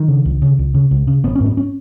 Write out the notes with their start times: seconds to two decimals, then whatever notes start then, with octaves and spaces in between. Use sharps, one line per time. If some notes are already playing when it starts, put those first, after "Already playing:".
Already playing: D#3
0.08 C#3
0.25 C#2
0.42 C#3
0.59 C#2
0.74 C#3
0.91 C#2
1.07 C#3
1.24 G#1 B3
1.35 C#4
1.40 G#2
1.46 B3
1.57 C#4